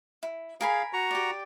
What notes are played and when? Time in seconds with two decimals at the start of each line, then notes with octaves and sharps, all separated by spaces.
0.23 E4
0.61 G#4 A#4 F5 G#5 B5
0.93 F#4 A#5 C#6
1.11 G4 D5